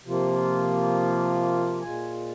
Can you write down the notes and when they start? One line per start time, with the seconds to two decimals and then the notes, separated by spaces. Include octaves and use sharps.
0.05 C3 F3 A#3 F4
1.82 A#2 G#3 F4 G#5